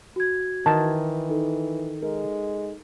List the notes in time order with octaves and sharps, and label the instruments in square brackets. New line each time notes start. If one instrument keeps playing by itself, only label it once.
[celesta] F#4 G#6
[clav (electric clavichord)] D#3 [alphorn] E3 [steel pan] A5
[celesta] D#4 A4
[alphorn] G#3 [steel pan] A#4